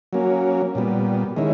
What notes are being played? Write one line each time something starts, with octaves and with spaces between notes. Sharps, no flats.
F#3 A#3 C#4
A#2 G3 B3
D#3 G#3 C#4 E4